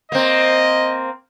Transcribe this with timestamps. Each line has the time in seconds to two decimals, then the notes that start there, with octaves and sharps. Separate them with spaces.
0.12 A#3 C4 D#5